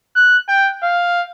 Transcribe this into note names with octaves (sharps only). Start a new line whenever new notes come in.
F#6
G5
F5